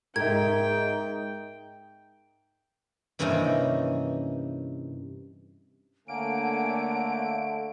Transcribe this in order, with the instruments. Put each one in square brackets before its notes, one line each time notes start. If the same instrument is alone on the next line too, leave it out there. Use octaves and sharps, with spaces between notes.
[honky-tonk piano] G#2 D#4 [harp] A#4 E5 [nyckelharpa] G5 [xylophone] G#6
[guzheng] G2 C3 E3 A#3 C#4 D#4
[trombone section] D3 A3 [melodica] A#3 [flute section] C#5 F#5 G#5 [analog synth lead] D7